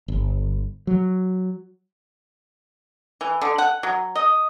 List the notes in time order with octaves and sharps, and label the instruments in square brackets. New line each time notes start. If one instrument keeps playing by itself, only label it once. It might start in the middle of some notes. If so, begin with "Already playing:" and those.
[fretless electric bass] G1
F#3
[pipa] E3
D3
F#5
F#3
D#5